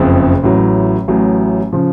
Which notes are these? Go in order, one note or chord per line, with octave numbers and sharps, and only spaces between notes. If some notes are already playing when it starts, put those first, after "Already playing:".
Already playing: F#1 F2 C#3
A1 A2 F#3
A1 A2 F#3
C#3 F3